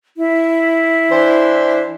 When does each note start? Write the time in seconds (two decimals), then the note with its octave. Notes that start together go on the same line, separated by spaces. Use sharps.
0.17 E4
1.11 E3 D4 C5